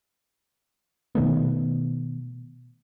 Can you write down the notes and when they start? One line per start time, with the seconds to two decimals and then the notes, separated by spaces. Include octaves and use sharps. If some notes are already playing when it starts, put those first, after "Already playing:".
1.15 B2 D#3 A3 B3